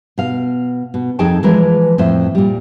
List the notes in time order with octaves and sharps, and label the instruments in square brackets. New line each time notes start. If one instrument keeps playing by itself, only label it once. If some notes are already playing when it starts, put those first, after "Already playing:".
[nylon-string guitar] B2 F5
B2
F2 D#4 G#4 A4 G5 A5
E3 F3 G#3 A#4 B4
F2 A2 C5 E5
A#2 G3